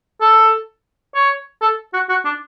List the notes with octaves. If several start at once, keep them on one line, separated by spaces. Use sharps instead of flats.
A4
C#5
A4
F#4
F#4
D4